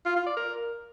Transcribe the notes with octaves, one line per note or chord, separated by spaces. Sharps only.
F4
F4
D5
A#4